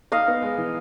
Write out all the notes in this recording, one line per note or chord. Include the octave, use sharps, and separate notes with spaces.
D#4 D#5 F5
B3
G#3
E3